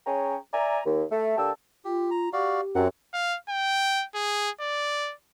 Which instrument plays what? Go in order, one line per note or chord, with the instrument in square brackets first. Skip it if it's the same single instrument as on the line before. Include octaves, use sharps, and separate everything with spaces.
[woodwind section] C#4 G#4 C#5 G5 A#5
D5 E5 G#5 A#5
D#2
A3
D3 A#3 G4 A5 E6
[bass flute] F4 [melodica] G4
[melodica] A#5
[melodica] F#4 D5 F5 [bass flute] G4
[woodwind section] F#2 [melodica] C4 F#5
[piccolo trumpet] F5
G5
G#4
D5